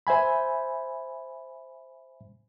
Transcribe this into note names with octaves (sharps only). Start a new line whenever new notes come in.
C5 E5 G#5 B5